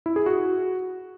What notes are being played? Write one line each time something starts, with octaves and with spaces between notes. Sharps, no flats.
E4
G#4
F#4